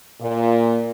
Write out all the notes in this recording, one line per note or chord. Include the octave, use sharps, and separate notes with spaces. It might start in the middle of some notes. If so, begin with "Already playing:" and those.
A#2